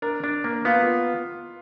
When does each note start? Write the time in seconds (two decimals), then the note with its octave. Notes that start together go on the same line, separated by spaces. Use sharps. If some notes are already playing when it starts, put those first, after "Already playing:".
0.02 D4 A#4
0.24 D4
0.44 A#3
0.65 B3 F4